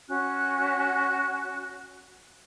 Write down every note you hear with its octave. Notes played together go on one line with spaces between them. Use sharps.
C#4 F#4 F#6